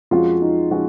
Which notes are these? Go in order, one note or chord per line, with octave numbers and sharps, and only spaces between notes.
F2 F3 G#3 C#4 F4 F#4
D#4
F3 G#3 C#4 F#4